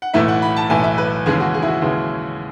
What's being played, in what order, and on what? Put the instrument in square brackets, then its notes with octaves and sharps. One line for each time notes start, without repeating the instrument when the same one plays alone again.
[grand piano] F#5
B1 A2 E3 A3 E5
F#5
B5
A5
B1 A2 E3 A3 G#5
E5
B4
D#2 C#3 E3 G#3 G#4
F#4
G#4
E4
F#4
D#2 C#3 E3 G#3